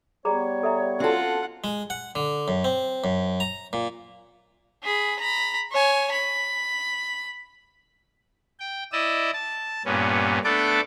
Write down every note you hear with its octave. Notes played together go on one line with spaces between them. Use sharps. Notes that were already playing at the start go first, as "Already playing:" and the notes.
G3 B3 G#4 C#5 A#5 D6
A4 E5 A#5
C4 C#4 F4 F#4 A4 F#5 G#5
G#3
F#5
D3
F#2
C4
F#2
A#5
A#2
G#4 B5
A#5 B5
C#5 G#5
B5
G5
E4 D5 D#5 E6
A5
G2 A#2 B3 C#4
A3 B3 D4 A4 A5 D6